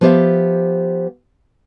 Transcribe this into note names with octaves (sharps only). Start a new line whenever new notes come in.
F3 B3 G4 C5 E5 F5